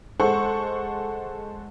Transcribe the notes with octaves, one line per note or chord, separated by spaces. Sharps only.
G#3 A4 C5 F#5 C#6